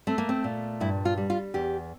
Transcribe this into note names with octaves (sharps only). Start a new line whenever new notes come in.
A3 C4
A#3
C4
A#2
G2 E4
F4
G3
F4
E2 G4